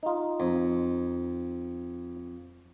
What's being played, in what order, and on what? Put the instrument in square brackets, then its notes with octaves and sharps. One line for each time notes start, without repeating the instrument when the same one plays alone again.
[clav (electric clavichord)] D#4 F4
[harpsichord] F2